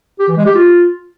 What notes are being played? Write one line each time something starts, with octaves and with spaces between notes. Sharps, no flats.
G4
E3
G#3
G4
F4